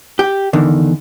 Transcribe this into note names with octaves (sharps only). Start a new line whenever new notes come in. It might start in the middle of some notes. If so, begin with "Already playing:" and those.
G4
E2 D3 D#3